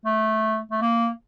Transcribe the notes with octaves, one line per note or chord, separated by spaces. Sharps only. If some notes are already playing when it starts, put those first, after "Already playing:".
A3
A3
A#3